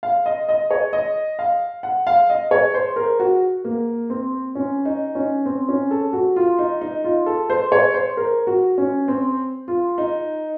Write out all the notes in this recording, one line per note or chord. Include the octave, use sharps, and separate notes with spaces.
F5
D#5
D#5
C#5
D#5
F5
F#5
F5
D#5
C#5
C5
A#4
F#4
A#3
C4
C#4
D#4
C#4
C4
C#4
A4
F#4
F4
D#4
D#4
F4
A4
C5
C#5
C5
A#4
F#4
C#4
C4
F4
D#4